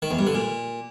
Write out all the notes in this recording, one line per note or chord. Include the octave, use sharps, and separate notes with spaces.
D#3
E2
G2
D3
A#2